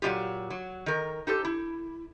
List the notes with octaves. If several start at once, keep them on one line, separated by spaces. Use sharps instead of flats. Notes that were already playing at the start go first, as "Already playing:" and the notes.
A#2 F#3 G#3 F4 G4
F#3
D#3 A#4
D#4 G4 A4 C5
E4